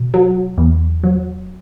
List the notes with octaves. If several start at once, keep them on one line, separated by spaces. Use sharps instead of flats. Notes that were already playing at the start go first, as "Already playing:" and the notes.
Already playing: B2
F#3
E2
F#3